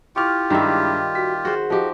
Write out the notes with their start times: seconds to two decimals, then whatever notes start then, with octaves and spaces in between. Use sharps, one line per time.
0.16 E4 F4 G4 C#6 D6 F6
0.50 G2 D#3 G3 G#3 E5
1.15 F#4 B6
1.45 F#4 G#4 C5
1.70 F3 D#4 F#4 G4